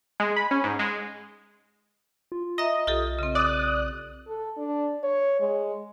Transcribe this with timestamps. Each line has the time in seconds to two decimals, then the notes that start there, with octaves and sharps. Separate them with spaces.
0.20 G#3
0.36 B5
0.51 C#4
0.64 G#2
0.79 G#3
2.32 F4
2.58 D#5 E5 A#5
2.87 B1 F4 G4 A4
3.19 C#3 C4
3.35 D5 D#6 F#6
4.28 A4
4.57 D4
5.03 C#5
5.40 G#3